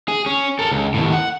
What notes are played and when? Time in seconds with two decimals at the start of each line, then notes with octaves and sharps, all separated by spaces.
0.08 G#4
0.26 C#4
0.59 A4 A#4
0.71 C#2
0.94 D#2 A2
1.13 F#5